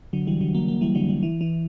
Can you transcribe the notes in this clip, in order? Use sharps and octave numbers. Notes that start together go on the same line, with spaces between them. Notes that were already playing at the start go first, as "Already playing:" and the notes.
D3 F#3
E3 G3
D3 F#3
F#3 A#3
F#3 A#3
E3 G3
D3 F#3
E3 G3
E3
E3